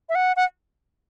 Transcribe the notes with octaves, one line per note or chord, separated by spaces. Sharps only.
E5
F#5
F#5